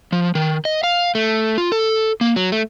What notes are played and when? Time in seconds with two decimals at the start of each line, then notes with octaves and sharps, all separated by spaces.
0.12 F3
0.35 D#3
0.65 D#5
0.83 F5
1.15 A3
1.58 F4
1.72 A4
2.21 A#3
2.36 F#3
2.52 A3